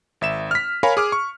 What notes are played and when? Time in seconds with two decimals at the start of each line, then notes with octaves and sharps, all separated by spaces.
0.21 G#1 E5 E7
0.51 F6 B6
0.83 A#4 C#5 F5 G#5 B5
0.97 G#4 D6 F6
1.12 C#6